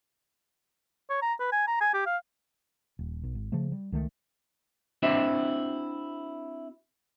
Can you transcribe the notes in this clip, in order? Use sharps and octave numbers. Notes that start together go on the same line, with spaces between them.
C#5
A#5
B4
G#5
A#5
G#5
G4
F5
D#1
B1
G#1
C#3 F3 A3
G3
C#2 D#3 A3
C4 D4 E4 F#4 C5 E5